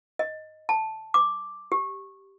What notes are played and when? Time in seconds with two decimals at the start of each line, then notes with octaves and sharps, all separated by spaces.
0.19 D#5
0.69 A5
1.14 D6
1.72 G4